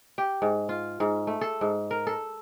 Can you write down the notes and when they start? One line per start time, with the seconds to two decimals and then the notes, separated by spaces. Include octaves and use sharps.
0.18 G4
0.42 G#2
0.69 F4
1.00 G#2
1.27 A3
1.41 A4
1.61 G#2
1.91 A#4
2.07 A4